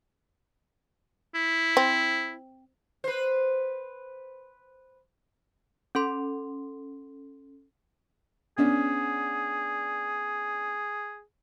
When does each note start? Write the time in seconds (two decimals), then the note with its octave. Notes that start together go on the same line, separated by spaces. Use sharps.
1.35 E4
1.77 C4
3.04 B4 C5
5.95 C#4 A4 C6
8.58 B3 C#4 D4 G#4